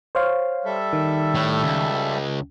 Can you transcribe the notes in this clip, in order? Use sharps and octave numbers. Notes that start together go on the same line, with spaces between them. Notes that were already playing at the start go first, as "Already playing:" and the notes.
C5 C#5 F5
G3 A4 E5
D#3
A2
C#2